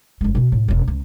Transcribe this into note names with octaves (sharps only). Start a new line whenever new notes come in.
F#1 G#3
B2 C4
A2
E1 C#4
C#2